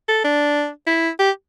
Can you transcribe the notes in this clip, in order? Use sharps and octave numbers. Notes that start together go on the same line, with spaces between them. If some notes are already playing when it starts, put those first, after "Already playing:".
A4
D4
E4
G4